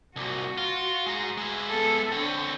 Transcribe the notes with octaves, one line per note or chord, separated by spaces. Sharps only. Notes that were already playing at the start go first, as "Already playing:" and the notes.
C2 A#2 F#4
F4
G#3 A#5
G#3 E4
B3 A4
D3 C4 C#5